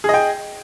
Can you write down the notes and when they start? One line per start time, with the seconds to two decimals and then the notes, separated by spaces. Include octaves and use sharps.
0.04 G#4
0.09 D#5
0.14 G5